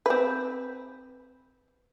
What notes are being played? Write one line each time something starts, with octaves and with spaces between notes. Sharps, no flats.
C4 B4